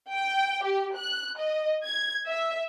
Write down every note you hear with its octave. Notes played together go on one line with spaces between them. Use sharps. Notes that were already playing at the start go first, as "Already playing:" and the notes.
G5
G4
F#6
D#5
G#6
E5